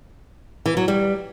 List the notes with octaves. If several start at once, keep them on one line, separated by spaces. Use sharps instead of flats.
E3
F#3
G3